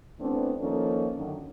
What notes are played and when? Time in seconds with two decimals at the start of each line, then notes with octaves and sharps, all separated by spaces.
0.19 E3 A3 B3 C4 D4
0.60 D#3 F3 A#3 C#4 D#4 A4
1.16 F#2 D3 D#3